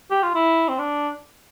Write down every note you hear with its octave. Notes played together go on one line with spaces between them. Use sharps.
G4
F4
E4
C4
D4